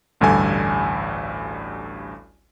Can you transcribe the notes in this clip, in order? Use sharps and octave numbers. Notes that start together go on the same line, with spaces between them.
A1 D2 G2 G3 A4 G#5